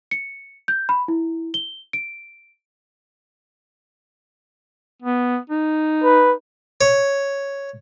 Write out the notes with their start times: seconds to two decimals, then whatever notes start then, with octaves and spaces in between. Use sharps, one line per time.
0.11 C#7
0.68 G6
0.89 B5
1.08 E4
1.54 G7
1.93 D7
5.03 B3
5.50 D#4
6.03 B4
6.81 C#5